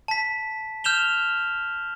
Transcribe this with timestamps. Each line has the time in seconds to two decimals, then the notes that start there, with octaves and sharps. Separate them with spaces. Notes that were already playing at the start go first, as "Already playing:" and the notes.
0.08 A5 B6
0.84 F6 G6 E7 F7 G7